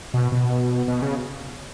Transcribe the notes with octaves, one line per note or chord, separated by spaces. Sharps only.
B2
B2
B2
C#3